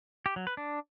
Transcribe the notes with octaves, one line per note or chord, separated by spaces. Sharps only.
G4
F#3
B4
D4